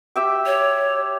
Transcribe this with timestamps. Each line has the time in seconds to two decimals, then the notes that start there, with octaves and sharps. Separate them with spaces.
0.16 G4 E5 G5
0.46 C#5